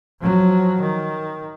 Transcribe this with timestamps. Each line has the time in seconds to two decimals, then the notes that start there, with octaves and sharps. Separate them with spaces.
0.20 F3 F#3
0.80 D#3